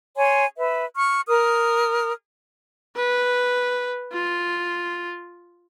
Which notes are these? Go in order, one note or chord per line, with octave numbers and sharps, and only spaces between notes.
C#5 G#5 C6
B4 E5
C#6 F6
A#4 D#6 F6
B4
F4